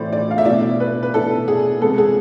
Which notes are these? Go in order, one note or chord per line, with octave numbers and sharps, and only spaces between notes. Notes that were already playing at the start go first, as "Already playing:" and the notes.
Already playing: A2 E3 A3 C5 D5
D5
F5
E5
B2 A3 E4 D5
B4
B4
B2 A3 E4 A4
G#4
C3 G#3 B3 A4
G#4